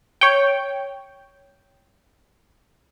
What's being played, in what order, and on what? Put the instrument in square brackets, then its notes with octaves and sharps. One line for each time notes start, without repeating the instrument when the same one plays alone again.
[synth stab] C#5 G5